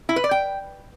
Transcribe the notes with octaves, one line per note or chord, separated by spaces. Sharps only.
E4
B4
D5
G5